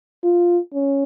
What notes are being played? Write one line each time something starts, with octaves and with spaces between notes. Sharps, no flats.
F4
C#4